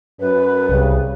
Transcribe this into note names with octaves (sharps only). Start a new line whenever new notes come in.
F#2 B4
C2 C#3 G3